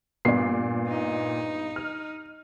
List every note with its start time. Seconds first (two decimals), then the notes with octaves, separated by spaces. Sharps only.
0.25 G2 A#2 B3 D5 C7
0.88 D#4
1.76 F6